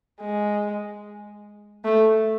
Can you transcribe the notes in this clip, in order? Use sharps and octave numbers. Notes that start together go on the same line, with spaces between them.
G#3
A3